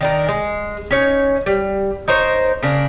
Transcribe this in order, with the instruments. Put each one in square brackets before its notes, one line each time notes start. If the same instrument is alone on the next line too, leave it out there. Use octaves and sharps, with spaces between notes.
[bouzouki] D#3 D4 A#4
G#3
C#4 D#4 C#5
G3
D#4 A#4 C5 C#5
C#3 A#3 D4